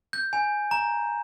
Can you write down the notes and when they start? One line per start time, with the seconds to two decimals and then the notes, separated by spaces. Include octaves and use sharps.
0.13 G6
0.33 G#5
0.71 A#5